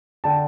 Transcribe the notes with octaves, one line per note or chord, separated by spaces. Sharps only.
D3 G5 A5